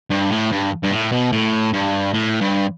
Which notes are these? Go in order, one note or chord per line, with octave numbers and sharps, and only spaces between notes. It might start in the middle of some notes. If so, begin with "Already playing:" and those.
G2
A2
G2
G2
A2
B2
A2
G2
A2
G2